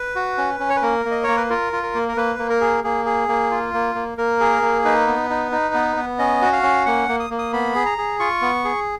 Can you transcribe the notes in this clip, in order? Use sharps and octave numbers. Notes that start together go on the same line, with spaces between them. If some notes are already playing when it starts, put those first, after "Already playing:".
Already playing: B4
F#4
C#4
C#4
C#5
B4
A#3 A#4
A#3
D#5
A#3 C#5
B4
F4 A#4
F4
A#4
A#3
A#4
A#3 B4
A#3
A#4
G#4
A#3 G#4
G#4
A#3
F4
A#3
A#3
A#3 A#4
G#4
A#3
D#4 B4
B3
D#4
D#4
B3
B3
C#4 D#5
F#4
F5
C#4
A#3 F#5
A#3
D#6
A#3
D#6
B3 B5
G#4
A#5
G#4
F4 C#6
B3
G#4